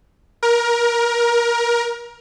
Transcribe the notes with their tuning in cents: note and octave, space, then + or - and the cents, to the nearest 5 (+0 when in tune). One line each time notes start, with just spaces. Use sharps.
A#4 +20